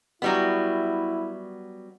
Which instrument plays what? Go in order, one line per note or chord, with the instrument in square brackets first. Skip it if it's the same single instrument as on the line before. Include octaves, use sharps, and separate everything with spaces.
[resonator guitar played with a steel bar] F#3 G3 B3 [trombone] E4